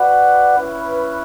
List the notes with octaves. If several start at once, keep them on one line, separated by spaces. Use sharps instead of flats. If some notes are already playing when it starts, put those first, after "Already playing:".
Already playing: F#4 B4 D5 F#5
C#4 E4 B4